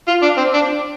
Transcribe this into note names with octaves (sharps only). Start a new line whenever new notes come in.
F4
D4
C4
D4